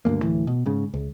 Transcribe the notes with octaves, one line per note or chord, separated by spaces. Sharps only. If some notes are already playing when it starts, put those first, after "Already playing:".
D2 G2 G#3 A#3
D1 A2 E3
B2
G#2 C#3
C#2